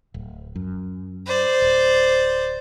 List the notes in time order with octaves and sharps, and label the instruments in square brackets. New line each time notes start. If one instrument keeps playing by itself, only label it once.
[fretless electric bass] D1
F#2
[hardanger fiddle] C5 D5
[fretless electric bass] D1